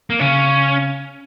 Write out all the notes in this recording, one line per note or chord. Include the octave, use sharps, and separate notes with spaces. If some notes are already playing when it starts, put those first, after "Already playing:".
A#3
C#3 C#4